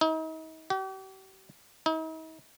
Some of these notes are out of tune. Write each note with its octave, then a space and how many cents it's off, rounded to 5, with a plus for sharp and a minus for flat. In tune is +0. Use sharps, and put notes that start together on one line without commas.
D#4 +40
G4 -40
D#4 +45